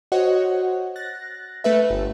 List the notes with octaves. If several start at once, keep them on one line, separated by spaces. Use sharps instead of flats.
F#4 C5 C#5 D#5 F#5
F#6 A6 A#6
A3 B4 E5
G1